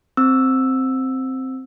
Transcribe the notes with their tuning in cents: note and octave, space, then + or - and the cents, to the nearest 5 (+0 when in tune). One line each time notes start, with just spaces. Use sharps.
C4 +0 E6 +0